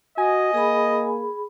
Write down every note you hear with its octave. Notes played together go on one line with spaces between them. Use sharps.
F#4 D#5 G#5
A#3 G#4 B5